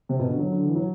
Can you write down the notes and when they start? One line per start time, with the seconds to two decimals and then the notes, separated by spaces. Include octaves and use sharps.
0.09 C3
0.19 B2
0.28 D3
0.39 F#3
0.52 D3
0.66 E3
0.75 F#3